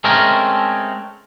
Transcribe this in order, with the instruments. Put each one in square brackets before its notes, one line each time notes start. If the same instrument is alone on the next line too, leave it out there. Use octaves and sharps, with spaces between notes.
[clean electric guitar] G#3 A3 C4 C#4 A#4